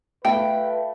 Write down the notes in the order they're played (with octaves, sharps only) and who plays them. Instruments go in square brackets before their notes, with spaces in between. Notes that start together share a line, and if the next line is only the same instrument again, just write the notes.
[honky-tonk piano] A3 [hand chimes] F#4 E5 F5 [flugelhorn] B4 [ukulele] G5